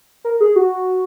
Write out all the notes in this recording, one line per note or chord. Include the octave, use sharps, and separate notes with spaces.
A#4
G#4
F#4